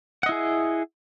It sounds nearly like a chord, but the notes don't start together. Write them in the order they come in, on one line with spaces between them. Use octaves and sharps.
F#5 D#5 E4 G#4